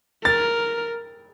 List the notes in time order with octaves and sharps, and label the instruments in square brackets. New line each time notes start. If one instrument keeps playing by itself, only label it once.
[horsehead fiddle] A#4 [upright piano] A6